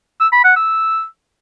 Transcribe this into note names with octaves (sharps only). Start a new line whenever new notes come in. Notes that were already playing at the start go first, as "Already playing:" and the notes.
E6
B5
F#5
E6